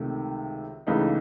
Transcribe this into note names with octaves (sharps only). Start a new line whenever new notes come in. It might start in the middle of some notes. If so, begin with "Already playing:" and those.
Already playing: C#2 C3 D#3 A3
C#2 C#3 E3 A3 D#4